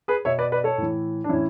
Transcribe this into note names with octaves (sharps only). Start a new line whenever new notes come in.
G#4 B4
B2 C#5 E5
B4 D5
B4 D5
A4 C#5
A2 E3
D4
A2 E3 C#4 E4